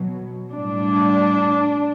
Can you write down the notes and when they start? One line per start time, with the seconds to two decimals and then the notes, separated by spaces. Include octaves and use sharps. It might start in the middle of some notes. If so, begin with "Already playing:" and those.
Already playing: B2 F#3
0.51 A2 G3 D4